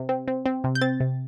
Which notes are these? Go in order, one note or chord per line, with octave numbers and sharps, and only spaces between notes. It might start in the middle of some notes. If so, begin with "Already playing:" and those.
Already playing: C3
C4
C4
C4
C3
G6
C4 A6
C3